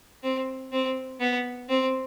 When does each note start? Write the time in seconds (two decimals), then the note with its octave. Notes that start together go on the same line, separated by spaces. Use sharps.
0.23 C4
0.72 C4
1.20 B3
1.69 C4